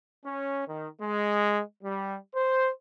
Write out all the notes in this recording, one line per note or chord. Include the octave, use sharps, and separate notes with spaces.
C#4
D#3
G#3
G3
C5